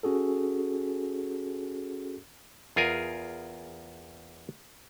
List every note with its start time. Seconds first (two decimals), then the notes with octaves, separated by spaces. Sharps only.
0.03 C#4 F#4 G#4 A4
2.76 E2 F4 G#4 A#4 G#5